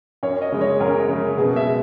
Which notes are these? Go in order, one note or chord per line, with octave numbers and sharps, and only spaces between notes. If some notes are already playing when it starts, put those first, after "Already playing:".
F#2 C#5
D#5
C#3 G#3
C#5
F#2 A#4
C#3 G#3
B2 G#4
E5
G#3